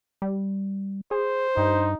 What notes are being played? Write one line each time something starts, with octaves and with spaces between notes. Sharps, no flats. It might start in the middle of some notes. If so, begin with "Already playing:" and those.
G3
G#4 C5
G2 D#4